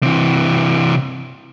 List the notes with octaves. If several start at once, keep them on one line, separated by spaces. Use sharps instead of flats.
C3 E3